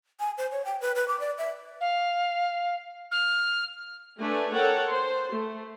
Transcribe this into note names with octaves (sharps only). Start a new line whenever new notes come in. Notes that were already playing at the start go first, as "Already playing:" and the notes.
G#5
C5
C#5
G5
B4
B4
D6
D5
E5
F5
F6
A3 D4 B4 G#5
A4 A#4 C#5 F#5 G5
C5 C6
A3